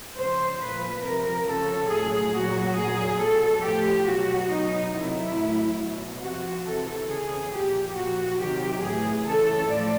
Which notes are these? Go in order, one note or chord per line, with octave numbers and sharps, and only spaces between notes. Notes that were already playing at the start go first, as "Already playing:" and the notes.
C#3 F3 C5
A#2 F3 B4
C3 F3 A#4
C#3 F3 A4
A2 F#3 G#4
A#2 F#3 F#4
A#2 F#3 G#4
B2 F#3 A4
A2 F3 G4
B2 F#3 F#4
B2 F#3 D#4
C3 D#3 F#3 E4
A2 F#3
B2 F#3
C3 F3 F#4
C3 E3 A4
C#3 E3 G#4
A#2 F3 G4
A#2 F3 F#4
C3 D#3 F#3 G4
A2 E3 G#4
C#3 E3 A4
A2 F3 D5